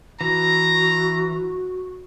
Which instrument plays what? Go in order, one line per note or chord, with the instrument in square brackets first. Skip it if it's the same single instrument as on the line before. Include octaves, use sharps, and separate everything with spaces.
[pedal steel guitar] E3 [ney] F#4 [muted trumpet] A#5